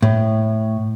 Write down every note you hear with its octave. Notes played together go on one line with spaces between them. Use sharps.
A2